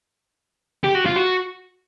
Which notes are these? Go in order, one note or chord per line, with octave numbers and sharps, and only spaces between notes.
G4
F#4
F4
F#4